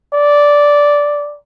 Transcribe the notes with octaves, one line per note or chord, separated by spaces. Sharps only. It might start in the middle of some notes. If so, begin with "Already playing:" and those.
D5